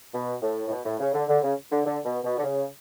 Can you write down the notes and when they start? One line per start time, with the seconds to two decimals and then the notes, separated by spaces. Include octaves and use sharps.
0.13 B2
0.42 A2
0.67 A2
0.70 B2
0.85 A2
1.00 C#3
1.13 D3
1.28 D3
1.42 C#3
1.71 D3
1.85 D3
2.05 B2
2.24 B2
2.37 D3
2.43 C#3